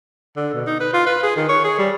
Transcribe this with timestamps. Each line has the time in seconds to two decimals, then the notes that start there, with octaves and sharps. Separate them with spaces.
0.37 D3
0.55 B2
0.67 D#4
0.81 B4
0.94 F4
1.06 B4
1.23 G#4
1.37 D#3
1.49 C#5
1.64 G#4
1.79 G3